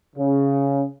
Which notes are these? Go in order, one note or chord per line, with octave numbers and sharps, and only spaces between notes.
C#3